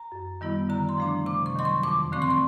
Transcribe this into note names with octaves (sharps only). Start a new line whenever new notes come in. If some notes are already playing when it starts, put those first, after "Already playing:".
Already playing: A#5
F#2
D#3 G3 B3 E4
D3 A#5
C6
F3 A3 D4
C3 D6
C#6
D#3 F#3 C6
C#6
F2 D6
D3 F3 A3 C4 C#6
C6
C#6